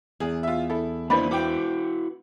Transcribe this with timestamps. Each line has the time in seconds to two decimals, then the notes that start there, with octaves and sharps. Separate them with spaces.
0.20 E2 G#4
0.43 F4 E5
0.70 E4 A4
1.10 A#3 D4 E4 B4 C5 D5 B5
1.31 E4 F#4 B4 G5 D6